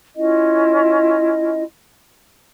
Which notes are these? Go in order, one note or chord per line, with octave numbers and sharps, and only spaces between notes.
C#4 E4 F4 D#5